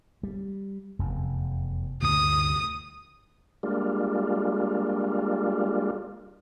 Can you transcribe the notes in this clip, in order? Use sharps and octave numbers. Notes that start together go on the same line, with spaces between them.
G3
F1 E2
D2 G2 C3 D#6
G3 G#3 A#3 D4 F4